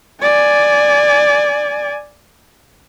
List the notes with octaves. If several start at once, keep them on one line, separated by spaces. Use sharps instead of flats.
D5 G#5